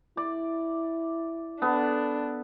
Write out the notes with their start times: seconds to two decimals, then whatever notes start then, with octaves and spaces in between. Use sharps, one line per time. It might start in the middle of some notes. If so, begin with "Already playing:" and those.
0.17 E4 D5
1.62 B3 D4 A4